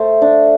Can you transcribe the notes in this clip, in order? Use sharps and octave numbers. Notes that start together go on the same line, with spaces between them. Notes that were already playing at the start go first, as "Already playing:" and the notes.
Already playing: A3 C5
D4